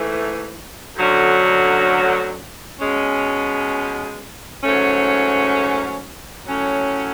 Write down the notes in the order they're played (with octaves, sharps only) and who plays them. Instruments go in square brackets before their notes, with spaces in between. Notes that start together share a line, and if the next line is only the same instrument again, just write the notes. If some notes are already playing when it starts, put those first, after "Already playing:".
Already playing: [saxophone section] G#2 E3 A3
D2 D3 F#3 C#4
B2 G#3 C#4
G#2 F#3 A3 C#4
A2 F#3 C#4